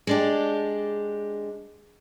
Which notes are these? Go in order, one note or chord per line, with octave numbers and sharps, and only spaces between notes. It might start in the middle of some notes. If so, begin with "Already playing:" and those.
G#3 D4 G4